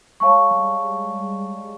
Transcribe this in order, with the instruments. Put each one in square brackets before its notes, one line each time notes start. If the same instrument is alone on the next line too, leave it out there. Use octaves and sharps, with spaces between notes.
[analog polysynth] G#3 [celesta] C#5 F5 A5 C#6
[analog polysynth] G3